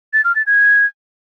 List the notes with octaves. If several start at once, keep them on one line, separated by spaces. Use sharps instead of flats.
A6
F6
A6
G#6